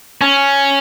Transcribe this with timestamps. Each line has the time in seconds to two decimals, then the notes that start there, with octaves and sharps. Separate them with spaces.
0.21 C#4